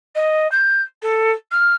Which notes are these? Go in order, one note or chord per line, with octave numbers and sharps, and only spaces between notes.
D#5
G6
A4
F6